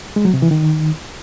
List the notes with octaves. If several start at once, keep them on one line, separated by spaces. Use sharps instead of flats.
G#3
F#3
C3
E3
D#3